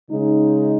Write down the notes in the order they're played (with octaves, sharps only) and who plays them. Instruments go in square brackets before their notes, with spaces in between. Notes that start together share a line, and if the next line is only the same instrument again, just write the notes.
[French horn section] C#3 G#3 D#4